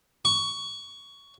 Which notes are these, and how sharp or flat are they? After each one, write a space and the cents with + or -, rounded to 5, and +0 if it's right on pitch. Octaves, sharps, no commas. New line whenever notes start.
C#6 +15